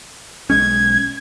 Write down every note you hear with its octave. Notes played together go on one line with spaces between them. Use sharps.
B1 G#3 C#4 G#6